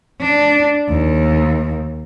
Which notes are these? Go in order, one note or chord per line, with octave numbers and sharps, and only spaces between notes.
D4
D#2